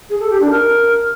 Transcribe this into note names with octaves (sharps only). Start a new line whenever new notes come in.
G#4
A4
G4
D4
A#4